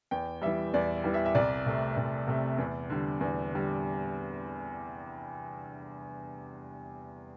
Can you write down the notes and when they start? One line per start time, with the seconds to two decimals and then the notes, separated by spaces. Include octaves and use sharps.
0.11 E2 G5
0.42 E3 G3 E5
0.74 E2 D5
1.04 E3 G3
1.14 E5
1.26 E5
1.35 C2 D5
1.66 C3 A3
1.97 C2
2.27 C3 A3
2.58 E2
2.90 D3 G3
3.21 E2
3.52 D3 G3